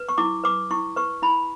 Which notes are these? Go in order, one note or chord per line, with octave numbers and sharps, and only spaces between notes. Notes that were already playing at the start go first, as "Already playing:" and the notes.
Already playing: B4
C#6
E4 D6
B4 D6
E4 C#6
B4 C#6
E4 B5